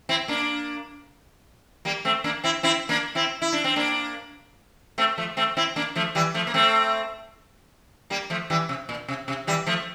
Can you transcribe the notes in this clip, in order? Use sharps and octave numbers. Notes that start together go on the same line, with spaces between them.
C4 E4
A#3 D4
G3 A#3
A3 C4
A#3 D4
C4 E4
C4 E4
A#3 D4
C4 E4
E4
D4
C4
A#3 D4
A3 C4
F3 A3
A3 C4
C4 E4
A#3 D4
F3 A3
E3 G3
F3 A3
A#3
A3 C4
G3 A#3
F3 A3
E3 G3
C3
A#2
C3
C3
E3 G3
F3 A3